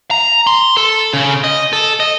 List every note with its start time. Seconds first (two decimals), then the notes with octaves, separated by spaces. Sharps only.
0.11 A#5
0.47 C6
0.77 A4
1.14 C#3
1.44 D#5
1.73 A4
2.00 D#5